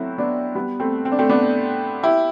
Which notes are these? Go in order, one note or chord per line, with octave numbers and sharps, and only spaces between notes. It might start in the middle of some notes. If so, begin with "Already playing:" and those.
Already playing: F#3 A3 B3 C4 E4 F#4
B3 D4
G3 B3
A3 C4
C4
D4
A3 C4
B3 D4
E4 G4